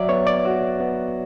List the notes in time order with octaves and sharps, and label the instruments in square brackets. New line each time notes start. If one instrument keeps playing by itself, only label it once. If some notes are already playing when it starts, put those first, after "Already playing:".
Already playing: [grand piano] F#3 [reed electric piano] D5 E5
[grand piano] B3 [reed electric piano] C#5
[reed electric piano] D5
[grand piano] F#4
B3